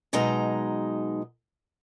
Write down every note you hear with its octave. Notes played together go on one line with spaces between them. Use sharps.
B2 F#3 G#3 D#4 A#5